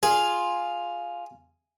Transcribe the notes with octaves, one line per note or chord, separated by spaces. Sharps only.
F4 G#4